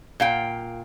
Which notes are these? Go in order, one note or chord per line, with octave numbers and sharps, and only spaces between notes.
A#2 F5 G5